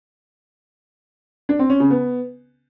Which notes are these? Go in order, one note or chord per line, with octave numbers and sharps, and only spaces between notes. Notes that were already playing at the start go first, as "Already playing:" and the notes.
D4
C4
C#4
C#3
B3